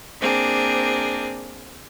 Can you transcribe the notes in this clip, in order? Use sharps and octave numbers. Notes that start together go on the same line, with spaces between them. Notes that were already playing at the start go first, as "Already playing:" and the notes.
A#3 C4 D4 G#4